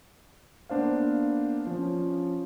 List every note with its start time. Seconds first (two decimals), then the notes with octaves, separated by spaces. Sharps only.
0.69 A#3 B3 D4 C5 F5
1.67 F3 C#4